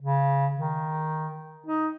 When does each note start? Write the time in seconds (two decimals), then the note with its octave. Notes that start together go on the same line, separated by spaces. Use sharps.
0.01 C#3
0.56 D#3
1.66 D#4